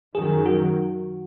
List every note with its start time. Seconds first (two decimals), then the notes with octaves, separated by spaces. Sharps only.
0.15 F#2 D#3 F#3 G#4
0.46 F#4